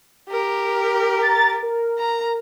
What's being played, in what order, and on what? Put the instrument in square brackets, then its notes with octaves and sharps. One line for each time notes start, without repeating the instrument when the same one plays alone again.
[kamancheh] G4 A#4
[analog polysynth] A#5 A6
A#4
[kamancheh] A#5